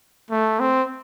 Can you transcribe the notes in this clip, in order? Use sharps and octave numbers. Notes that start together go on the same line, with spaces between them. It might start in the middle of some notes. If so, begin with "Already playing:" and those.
A3
C4